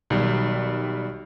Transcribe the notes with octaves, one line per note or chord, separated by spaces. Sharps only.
B1 D#3 G3